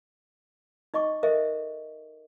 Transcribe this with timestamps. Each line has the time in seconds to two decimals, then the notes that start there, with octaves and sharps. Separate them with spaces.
0.94 D#4 D#5 C#6 D6
1.23 A4 A#4 C5 D#5 E5